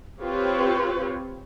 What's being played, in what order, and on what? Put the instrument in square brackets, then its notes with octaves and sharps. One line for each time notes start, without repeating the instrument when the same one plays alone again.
[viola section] C4 F4 G4 B4 C#5